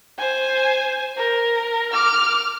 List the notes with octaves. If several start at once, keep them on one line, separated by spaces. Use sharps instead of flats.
C5 G#5
A#4
D6 F6